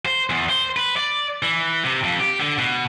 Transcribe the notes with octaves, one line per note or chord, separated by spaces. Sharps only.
C5
E2
C5
B4
D5
E3
C3
F2
G4
D3
B2